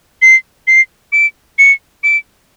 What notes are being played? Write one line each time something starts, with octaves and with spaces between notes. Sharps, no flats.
C7
C7
D7
C#7
D7